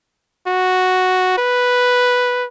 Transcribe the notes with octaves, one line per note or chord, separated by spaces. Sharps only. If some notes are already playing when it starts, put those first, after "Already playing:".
F#4
B4